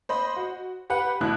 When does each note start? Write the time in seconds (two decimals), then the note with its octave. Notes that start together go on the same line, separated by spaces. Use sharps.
0.09 C5 D#5 B5
0.36 F#4
0.90 G4 B4 F#5
1.21 A1 B2 E4 F#6